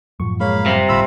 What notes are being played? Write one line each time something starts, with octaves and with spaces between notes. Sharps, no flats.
F#2 A2 F3 C#6
G#3 A#3 C#5 F5 B5
C3 G3 A#6
D1 G1 D2 F4 B5 E6